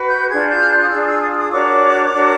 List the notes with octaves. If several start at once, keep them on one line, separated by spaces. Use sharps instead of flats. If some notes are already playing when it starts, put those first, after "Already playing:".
Already playing: F#4 B4
G6
D4 F4 G#4 G#6
G6
F6
F#6
D#6
D4 F4 G#4 E6
D#6
E6
D#6
E6
D#6
D4 F#4 A#4 C#5 D6
D4 F#4 A#4 C#5